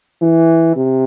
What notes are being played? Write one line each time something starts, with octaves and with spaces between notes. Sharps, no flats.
E3
C3